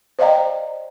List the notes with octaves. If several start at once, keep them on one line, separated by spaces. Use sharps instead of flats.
C5 D5 D#5 F5 G5 A#5